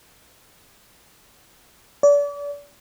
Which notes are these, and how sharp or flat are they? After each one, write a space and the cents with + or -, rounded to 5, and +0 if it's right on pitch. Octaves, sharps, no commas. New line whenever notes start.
D5 -35